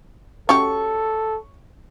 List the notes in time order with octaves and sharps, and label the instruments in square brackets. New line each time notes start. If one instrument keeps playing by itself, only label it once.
[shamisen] C#4 F#4 G4 [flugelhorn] A4 [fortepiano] C#6